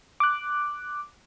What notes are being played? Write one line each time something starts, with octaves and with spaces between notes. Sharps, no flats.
D6 F#6